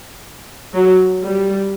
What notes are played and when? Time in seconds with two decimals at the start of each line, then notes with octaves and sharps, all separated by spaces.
0.73 F#3
1.24 G3